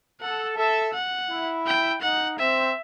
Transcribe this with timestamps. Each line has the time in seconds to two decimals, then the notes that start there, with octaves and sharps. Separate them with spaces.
0.21 A4 F#5
0.57 A4 E5
0.94 F#5
1.30 E4
1.66 G5
2.02 D#4 F#5
2.39 C4 E5